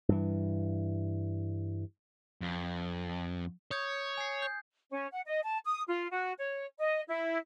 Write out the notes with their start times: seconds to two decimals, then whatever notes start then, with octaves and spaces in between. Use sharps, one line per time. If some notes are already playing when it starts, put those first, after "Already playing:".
0.09 G2 E3
2.41 F2
3.71 C#5 D#6 G6 G#6
4.17 G#5 C7
4.42 G6
4.91 C#4
5.12 F#5
5.25 D#5
5.43 A5
5.65 D#6
5.88 F4
6.11 F#4
6.38 C#5
6.79 D#5
7.08 E4